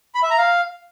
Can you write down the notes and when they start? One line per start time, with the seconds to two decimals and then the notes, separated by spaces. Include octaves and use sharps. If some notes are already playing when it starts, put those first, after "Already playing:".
0.15 B5
0.23 E5
0.30 A#5
0.38 F5